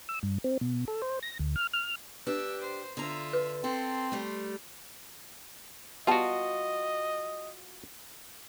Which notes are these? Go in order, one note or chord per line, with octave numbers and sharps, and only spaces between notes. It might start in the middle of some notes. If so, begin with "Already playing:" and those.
E6
G2
C4
B2
A4
C5
A#6
D2
F6
F6
D4 G4 B4 E6
C5
D3 F4 E5 A#5
B4
C4 A4 C6
G3 A3
G3 B3 F4 F#4 D#5 A5